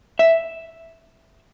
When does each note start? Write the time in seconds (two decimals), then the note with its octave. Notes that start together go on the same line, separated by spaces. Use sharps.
0.19 E5